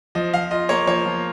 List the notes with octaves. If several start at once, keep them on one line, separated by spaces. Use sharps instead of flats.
F3 D#5
F3 F5
F4 D#5
A#3 C#5
F3 C#5
F3